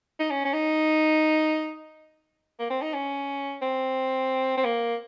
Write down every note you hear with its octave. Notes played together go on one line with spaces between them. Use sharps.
D#4
C#4
C#4
D#4
A#3
C4
D#4
C#4
C4
C4
A#3